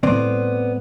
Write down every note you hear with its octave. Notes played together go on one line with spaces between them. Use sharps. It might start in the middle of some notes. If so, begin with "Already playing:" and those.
A2 G3 B3 C4 D5